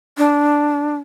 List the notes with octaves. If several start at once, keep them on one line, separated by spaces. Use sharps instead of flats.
D4